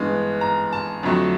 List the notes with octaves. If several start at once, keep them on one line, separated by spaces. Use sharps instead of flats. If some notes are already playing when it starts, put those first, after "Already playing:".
Already playing: G2 E3 G#3 B3
A#5
A5
F2 D3 F#3 A3